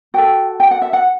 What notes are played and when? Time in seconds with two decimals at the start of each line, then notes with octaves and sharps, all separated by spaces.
0.14 F#4 A4 G5
0.60 G5
0.71 F#5
0.82 E5
0.93 F#5